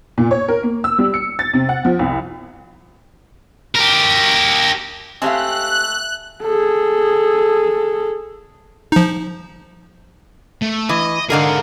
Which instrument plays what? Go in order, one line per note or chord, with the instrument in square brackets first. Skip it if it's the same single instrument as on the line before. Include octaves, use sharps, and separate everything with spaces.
[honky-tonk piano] A#2
C#5
A#4
A#3
E6
G3
C#7
A6
C3
F#5
F3
C2
[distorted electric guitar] G4 A#4
[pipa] G#3 A3 [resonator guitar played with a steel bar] C4 G4 F5 [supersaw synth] F#6
[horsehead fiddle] G#4 A4
[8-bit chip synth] F3 D#4
[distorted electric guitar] A3
[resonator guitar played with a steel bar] E3 [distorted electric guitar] D#5
[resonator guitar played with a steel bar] G#2 D3 A#4 [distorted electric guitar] G#4 F5